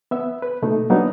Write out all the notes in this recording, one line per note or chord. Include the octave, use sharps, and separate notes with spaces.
B3 E5
B4
B2 A3 A#3 D#4
F#3 G3 A#3 B3 D4 D#4